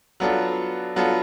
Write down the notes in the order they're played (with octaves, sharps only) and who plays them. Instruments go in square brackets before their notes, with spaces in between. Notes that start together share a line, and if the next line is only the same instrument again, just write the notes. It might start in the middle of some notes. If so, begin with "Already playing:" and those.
[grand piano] F#3 B3 D4 F4 A4
F#3 B3 D4 F4 A4